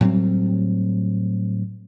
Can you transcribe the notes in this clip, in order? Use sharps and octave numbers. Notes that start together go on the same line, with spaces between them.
A2 F#3 G3 C4